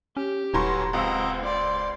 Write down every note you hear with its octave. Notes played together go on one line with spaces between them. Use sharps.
C#4 G4
D#1 A2 F#3 C#4 F#4 B4 C6
C#2 C4 D#5 F#5 A#5 E6
C5 D5 C6